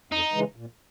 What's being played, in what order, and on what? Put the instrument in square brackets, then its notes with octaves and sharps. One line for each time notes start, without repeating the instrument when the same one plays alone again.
[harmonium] F2 [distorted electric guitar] D#4
[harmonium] C#3 E3 G#3
A#2